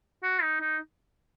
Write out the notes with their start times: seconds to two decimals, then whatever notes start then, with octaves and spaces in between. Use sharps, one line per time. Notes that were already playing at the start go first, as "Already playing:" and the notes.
0.23 F#4
0.42 D#4
0.60 D#4